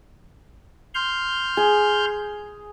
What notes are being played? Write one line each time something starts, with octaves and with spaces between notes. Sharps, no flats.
C6 F6 G6
G#4